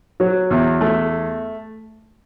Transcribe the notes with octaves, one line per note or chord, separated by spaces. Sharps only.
F#3
E2
A3